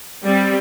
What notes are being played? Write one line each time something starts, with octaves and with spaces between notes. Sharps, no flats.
G3 C4